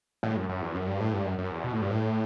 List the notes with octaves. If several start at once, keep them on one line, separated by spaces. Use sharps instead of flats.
A2
F#2
F#2
E2
F#2
G2
A2
G2
F#2
F#2
E2
B2
A2
G2
A2